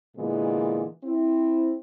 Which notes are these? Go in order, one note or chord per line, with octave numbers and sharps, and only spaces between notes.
A#2 D3 E3 G#3 B3
C4 E4